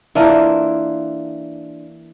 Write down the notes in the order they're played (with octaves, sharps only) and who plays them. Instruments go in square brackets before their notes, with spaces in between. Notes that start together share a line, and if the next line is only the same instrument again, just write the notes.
[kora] E3 A#3 D4 F4